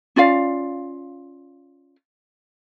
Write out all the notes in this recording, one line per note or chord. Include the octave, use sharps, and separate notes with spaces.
C#4 F4 D5 F5